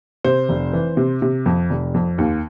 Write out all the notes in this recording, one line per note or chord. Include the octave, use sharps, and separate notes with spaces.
C3 C5
F1
E3
C3
C3
F2
F1
F2
D#2